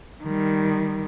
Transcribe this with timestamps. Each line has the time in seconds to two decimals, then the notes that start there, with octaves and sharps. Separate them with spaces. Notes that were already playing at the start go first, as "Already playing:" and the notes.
0.23 D#3 G3